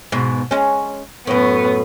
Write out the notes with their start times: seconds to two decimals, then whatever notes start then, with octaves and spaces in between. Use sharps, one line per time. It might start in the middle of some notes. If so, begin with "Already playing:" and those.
0.12 G#2 B2
0.51 G#3 C#4
1.27 F#2 A2 B3